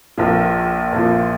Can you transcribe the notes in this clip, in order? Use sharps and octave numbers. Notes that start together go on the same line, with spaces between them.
A#1 A#2 F3
A#1 A#2 F3